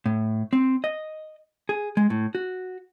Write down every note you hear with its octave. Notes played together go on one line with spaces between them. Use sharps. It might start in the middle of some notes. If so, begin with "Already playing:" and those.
A2
C4
D#5
G#4
G#3
A2
F#4